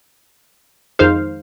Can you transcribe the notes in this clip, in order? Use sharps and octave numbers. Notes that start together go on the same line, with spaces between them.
F2 D#3 G#3 D#4 C5 F5